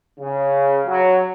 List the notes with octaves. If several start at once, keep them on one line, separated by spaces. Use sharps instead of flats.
C#3
F#3